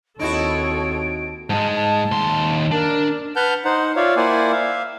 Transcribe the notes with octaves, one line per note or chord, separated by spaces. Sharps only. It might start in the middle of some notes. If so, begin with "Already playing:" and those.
D#2 C4 D#4 E4 F#4 A4 C#5 D7
G#2 G#3 A5
A5
D#2 C6
D4 A#4
B4 F#5 A5 F6 G6
D#4 C5 F#5
F4 C#5 D5 E5 F5
A#3 E4 C5 D5 F#5 G#5
E5 F5